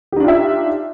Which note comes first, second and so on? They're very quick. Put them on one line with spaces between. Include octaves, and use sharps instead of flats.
G4 D#4 D4 F4 E5